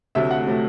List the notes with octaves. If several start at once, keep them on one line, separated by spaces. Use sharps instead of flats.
D2 C3 F#3 A3 E5
F#5
C3 F#3 A3